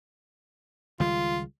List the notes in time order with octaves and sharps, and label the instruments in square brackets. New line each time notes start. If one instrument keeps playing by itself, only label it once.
[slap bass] C#2 D#3 G3 [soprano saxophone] F4